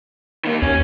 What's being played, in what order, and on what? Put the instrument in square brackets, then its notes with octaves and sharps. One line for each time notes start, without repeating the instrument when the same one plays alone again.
[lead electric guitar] D#3 A#3
[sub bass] D#2 [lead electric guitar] C#4